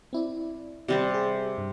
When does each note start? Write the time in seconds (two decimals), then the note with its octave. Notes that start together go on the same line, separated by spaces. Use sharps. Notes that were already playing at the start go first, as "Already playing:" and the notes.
0.13 C4 E4 D5
0.88 C3 G3 C4 D5 B5
1.14 G#4
1.58 G2